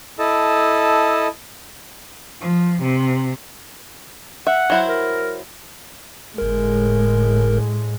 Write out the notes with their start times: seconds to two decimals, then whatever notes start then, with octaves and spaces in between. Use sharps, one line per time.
0.19 E4 A4 D#5 A5
2.41 F3
2.82 C3
4.47 E5 F#5
4.70 F#3 E4 C5
4.89 A#4
6.38 G1 A2 G#3 A#4